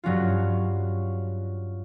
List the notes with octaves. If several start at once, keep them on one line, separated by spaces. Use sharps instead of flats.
G2 F#3 C#4 F4